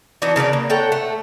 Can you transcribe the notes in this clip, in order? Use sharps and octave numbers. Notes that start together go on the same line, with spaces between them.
E3 D4 D#4 F#4
C#3 A#4 B4 D5
A#3
A4 C#5 F#5 G5
A3